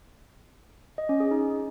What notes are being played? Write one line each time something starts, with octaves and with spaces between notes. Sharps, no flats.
D#5
C#4
G#4
D#4